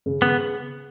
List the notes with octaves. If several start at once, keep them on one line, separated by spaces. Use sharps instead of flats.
C#3
C#3 B3